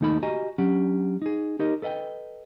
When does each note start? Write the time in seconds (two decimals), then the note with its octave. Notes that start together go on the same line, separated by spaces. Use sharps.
0.01 D#2 A3 D#4 A4 B5
0.23 F#4 G4 D#5 G#5 A#5
0.58 F#3 C#4 D4 G4 F#5
1.22 D#4 G#4
1.59 D#4 G4 A#4 D#5
1.82 A4 B4 D#5 F#5 G5